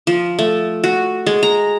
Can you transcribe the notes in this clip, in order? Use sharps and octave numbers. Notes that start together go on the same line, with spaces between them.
F3
A3
F#4
G#3
A#5